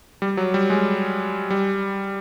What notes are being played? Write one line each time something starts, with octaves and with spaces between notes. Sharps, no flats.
G3
F#3
G3
G#3
G3